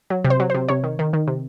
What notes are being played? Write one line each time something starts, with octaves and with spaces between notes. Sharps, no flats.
F#3
C3
C5
F#3
C3 C5
C3 C#5
D#3
D#3
D#3
C3